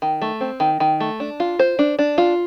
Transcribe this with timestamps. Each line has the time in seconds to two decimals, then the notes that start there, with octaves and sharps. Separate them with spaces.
0.02 D#3
0.22 A3
0.41 C4
0.60 D#3
0.80 D#3
1.00 A3
1.20 D4
1.40 F4
1.59 C5
1.79 D4
1.99 D4
2.18 F4